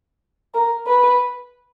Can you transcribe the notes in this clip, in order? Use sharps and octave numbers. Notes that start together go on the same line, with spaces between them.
A#4
B4